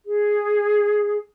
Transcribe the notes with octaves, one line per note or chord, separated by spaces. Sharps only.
G#4